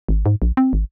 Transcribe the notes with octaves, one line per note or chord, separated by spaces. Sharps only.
G#1
G#2
A#1
C4
G#1